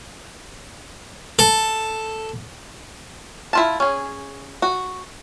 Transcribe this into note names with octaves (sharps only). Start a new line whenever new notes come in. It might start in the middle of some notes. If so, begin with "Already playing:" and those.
A4
E4 F4 A5
C#4 G#4
F#4